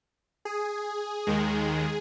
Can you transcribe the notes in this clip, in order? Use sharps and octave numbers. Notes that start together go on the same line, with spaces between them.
G#4
D#2 D#3 G#3